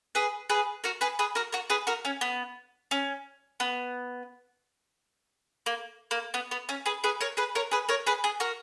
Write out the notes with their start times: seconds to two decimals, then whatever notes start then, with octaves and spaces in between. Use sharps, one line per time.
0.15 G#4 B4
0.50 G#4 B4
0.84 F#4 A#4
1.01 G#4 B4
1.19 G#4 B4
1.35 F#4 A#4
1.52 F#4 A#4
1.70 G#4 B4
1.87 F#4 A#4
2.05 C#4
2.21 B3
2.91 C#4
3.60 B3
5.66 A#3
6.11 A#3
6.34 B3
6.51 B3
6.69 C#4
6.86 G#4 B4
7.04 G#4 B4
7.21 A#4 C#5
7.37 G#4 B4
7.55 A#4 C#5
7.71 G#4 B4
7.89 A#4 C#5
8.07 G#4 B4
8.24 G#4
8.40 F#4 A#4